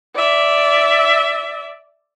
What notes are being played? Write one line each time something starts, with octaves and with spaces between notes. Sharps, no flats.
D5 E5